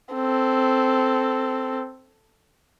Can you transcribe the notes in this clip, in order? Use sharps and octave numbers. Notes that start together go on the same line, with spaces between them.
C4 A4